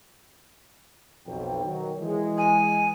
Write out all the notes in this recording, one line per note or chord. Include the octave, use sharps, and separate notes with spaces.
B1 F2 G5
D#3 F#3
E3 G#3 G#4
G#5